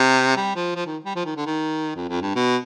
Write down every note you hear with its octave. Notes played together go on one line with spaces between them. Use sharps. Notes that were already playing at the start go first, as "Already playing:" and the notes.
Already playing: C3
G3
F3
F3
D#3
G3
F3
D#3
D3
D#3
F2
F2
G2
B2